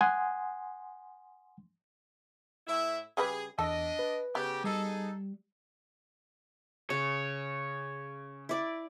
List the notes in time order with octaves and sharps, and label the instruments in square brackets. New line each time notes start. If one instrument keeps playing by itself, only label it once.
[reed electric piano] F#5 G#5 C6 D#6
[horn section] A2 E4 E5
[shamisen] C#3 G3 B4 [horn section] G#4
[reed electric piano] E2 [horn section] D4 D#5 [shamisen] A4
[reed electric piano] B4
[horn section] C#3 G4 [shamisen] B3
[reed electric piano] G3 [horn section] D#4 G#4 A4
[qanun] C#3 [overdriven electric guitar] C#5
[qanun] E4 D5